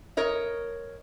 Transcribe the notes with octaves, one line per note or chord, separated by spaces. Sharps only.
A#4 C#5 D#5